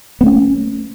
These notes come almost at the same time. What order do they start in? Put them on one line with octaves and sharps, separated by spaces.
B3 A3 C#4